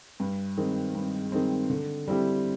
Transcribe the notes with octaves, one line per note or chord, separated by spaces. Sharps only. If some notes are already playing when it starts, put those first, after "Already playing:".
G2
D#3 G#3 C4
G2
D#3 G#3 C4
D3
G3 C4 E4 G4